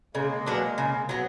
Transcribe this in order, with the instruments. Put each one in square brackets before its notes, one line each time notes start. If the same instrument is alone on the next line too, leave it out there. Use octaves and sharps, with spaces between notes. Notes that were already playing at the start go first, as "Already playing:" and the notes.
[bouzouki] C#3 [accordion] G#3 A#3
[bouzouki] F#3 B3 D4
C#3
F#3 B3